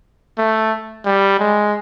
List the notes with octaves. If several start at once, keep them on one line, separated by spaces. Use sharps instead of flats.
A3
G3
G#3